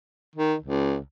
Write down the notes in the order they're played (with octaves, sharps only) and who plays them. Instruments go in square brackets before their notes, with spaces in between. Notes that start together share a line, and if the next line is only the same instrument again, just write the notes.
[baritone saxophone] D#3
C#2